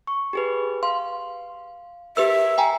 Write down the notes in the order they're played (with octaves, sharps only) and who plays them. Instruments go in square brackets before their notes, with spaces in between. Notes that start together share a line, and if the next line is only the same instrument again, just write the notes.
[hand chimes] C#6
G4 G#4 B4
[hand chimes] F5 [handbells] C6
[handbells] G4 B4 E6 [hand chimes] A#4 [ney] E5
[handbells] G5 G#5 A#5